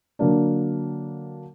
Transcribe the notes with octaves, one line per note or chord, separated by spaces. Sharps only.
D3 F#3 A#3 D4